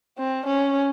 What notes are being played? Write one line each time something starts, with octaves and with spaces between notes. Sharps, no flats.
C4
C#4